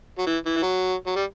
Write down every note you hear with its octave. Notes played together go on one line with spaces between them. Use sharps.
F#3
E3
E3
E3
F#3
F#3
G3